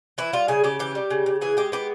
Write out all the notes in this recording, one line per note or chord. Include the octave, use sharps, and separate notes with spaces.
E3 E4
G3 F4
C#3 G#4
C#3 G4
E3 G4
G3
C#3
C#3
E3 G#4
G#3 G4
B3 G4